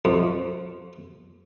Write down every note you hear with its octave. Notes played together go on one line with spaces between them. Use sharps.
F2